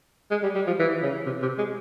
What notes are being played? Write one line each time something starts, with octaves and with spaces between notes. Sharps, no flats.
G#3
G3
G3
F3
E3
C#3
C3
C3
G#3